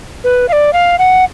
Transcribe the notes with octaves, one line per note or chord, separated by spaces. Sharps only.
B4
F5
D5
F5
F#5